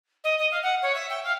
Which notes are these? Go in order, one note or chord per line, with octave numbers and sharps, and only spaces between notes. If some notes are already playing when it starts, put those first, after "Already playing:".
D#5
D#5
F5
F#5
C#5
E5
G5
F5